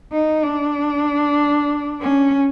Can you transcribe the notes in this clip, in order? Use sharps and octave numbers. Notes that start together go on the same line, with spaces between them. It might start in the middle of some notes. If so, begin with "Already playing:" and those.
D#4
D4
C#4